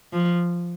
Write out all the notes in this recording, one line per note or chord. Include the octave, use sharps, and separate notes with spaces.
F3